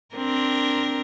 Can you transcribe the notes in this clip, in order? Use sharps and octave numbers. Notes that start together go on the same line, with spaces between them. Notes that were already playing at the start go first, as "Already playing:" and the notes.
C4 D4 A#4